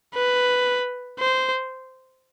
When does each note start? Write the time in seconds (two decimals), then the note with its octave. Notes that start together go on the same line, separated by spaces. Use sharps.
0.15 B4
1.20 C5